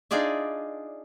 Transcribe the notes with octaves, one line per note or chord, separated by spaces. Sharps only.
D4 D#4 F4 G#4 D5 E5